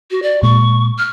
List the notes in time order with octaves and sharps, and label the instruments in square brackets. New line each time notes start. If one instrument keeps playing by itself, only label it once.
[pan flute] F#4
D5
[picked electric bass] A#2 G#3 [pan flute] C#6
[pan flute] F6